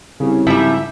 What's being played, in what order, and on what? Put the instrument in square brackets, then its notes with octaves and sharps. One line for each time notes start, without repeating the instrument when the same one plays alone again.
[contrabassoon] C2 [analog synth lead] C#3
[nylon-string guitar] G#2 C#3 [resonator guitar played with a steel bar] F3 G3 [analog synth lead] E5